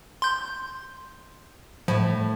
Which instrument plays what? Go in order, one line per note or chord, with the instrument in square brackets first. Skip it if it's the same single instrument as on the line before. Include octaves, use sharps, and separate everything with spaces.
[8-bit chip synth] C6 G6
[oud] A2 [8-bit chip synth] F3